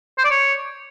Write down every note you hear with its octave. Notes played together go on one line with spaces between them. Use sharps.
C5
D5
C#5